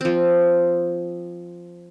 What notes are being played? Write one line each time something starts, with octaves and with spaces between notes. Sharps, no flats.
F3 C4